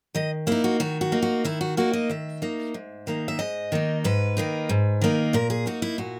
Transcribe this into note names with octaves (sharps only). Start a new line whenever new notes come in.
D#3 D#5
A#3 D#4 E4
F#4
D#3 F#4
F#4
A#3 D#4
F#4
D#3 E4
F#4
A#3 D#4 F#4
D#5
D#3 E5
A#3 D#4
G#2
D#3 A#3 D#4
E5
G#2 D#5
D#3 A#3 D#4
G#2 B4
D#3 A#3 D#4
G#2
D#3 A#3 D#4
A#2 A#4
G#4
A#3 D#4 F#4
E4
A#2 F#4